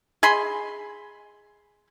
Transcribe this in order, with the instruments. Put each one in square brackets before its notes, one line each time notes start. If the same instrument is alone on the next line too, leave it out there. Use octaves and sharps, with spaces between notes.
[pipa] G#4 D#5 B5 C6